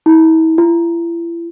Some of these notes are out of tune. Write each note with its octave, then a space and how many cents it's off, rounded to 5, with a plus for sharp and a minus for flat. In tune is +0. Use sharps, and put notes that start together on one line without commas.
E4 -40
E4 +40